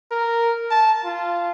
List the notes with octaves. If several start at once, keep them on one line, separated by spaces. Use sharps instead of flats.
A#4
A5
F4